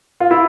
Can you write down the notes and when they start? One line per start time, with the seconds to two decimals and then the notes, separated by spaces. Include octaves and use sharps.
0.20 F4
0.31 E4